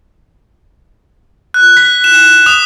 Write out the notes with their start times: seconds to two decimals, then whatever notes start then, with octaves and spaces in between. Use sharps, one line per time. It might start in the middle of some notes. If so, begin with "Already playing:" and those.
1.54 F#6
1.77 B6
2.04 E7
2.46 D#6